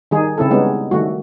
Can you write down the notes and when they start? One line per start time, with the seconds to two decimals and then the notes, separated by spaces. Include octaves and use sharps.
0.11 D#3 G3 D#4 G#4
0.38 C#3 C4 E4 A4
0.51 G3 G#3 B3 C#4 D#4
0.91 D#3 G3 A3 F#4